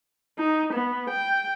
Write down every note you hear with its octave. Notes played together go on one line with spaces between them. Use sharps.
D#4
B3
G5